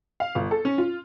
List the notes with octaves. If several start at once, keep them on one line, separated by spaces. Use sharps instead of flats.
F5
G1
A4
C#4
F4